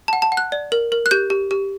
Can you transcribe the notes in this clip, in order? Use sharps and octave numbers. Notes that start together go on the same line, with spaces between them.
F#5 A5
A5
F#5
F#6
D5
A#4
A#4
F#6
G4 G6
G4
G4